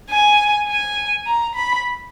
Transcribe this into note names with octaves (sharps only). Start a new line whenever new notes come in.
G#5
G#5
A#5
B5